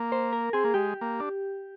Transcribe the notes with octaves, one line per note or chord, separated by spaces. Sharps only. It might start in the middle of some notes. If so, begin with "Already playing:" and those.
Already playing: A#3
C5
A#4
C4 G#4
A#3
G#3 G4
A#3
D4